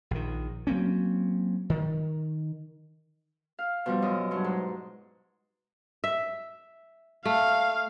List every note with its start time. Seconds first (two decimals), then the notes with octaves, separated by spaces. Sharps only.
0.11 A#1 D#3
0.67 F#3 A#3 C4 C#4
1.70 D#3
3.59 F5
3.86 B2 F3 G3
4.02 F#2 D#5
4.31 G2 F#3
4.44 G#2
6.04 E5
7.25 A3 F5